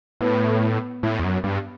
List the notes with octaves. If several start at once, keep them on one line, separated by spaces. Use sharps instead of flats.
A2 B3
A2
E2
F#2
G2